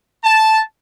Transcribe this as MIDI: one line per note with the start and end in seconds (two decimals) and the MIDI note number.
0.24 0.61 81